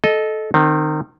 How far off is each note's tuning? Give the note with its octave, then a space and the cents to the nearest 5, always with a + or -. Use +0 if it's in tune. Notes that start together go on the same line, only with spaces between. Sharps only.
A4 -15 D#5 -5
D#3 -25 C4 +0